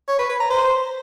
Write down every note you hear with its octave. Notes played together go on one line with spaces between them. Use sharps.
C#5
B4
B4
A#5
C5